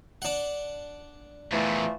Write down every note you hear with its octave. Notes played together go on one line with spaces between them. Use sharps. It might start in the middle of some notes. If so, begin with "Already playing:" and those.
D4 F#5
E2 A#2 E3 F3 A3